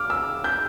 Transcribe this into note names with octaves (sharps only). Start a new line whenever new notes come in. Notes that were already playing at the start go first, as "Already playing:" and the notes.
Already playing: D6 F6
E6
G6